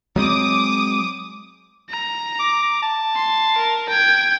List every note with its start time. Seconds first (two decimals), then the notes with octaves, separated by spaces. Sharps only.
0.16 F#3 G#3 C4 D6 D#6
1.90 A#5
2.40 D6
2.83 A5
3.15 C6
3.57 A#4
3.89 G5 G#6